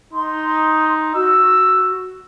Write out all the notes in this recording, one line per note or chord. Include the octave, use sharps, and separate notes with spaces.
D#4 C6
F#4 E6